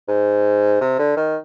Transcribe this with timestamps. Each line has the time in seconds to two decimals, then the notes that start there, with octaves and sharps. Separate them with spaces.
0.08 G#2
0.81 C3
0.99 D3
1.17 D#3